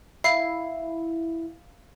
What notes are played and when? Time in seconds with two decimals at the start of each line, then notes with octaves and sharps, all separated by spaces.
0.24 E4 F5 C7